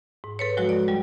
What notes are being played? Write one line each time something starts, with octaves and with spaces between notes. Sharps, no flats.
G#2
G#2 A4 B4 C#5
F3 F#3 G#3 F#4
D5
F#3 G3